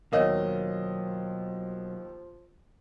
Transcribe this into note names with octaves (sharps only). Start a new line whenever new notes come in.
D#2 B2 F3 F#3 A#4 C#5 D#5 F5